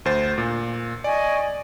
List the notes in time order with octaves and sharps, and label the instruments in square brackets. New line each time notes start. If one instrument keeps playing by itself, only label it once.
[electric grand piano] D2 C5 A6
A#2
[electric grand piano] D5 [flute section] D#5 G#5 C#6